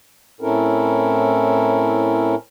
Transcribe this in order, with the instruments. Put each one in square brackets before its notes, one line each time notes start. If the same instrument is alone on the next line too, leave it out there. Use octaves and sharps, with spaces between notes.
[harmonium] A2 C4 C#4 E4 A4 A#4